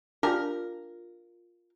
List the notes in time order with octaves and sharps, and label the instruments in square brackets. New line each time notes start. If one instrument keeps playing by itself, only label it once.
[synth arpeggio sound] D4 G4 [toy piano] F4 F5 [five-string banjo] A#4